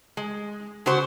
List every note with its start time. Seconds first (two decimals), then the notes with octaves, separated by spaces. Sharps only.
0.17 G#3
0.86 C#3 F#4 C5